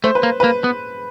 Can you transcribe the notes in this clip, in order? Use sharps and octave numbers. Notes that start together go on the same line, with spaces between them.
A3 C5
B4
A#3
A#3 B4
B3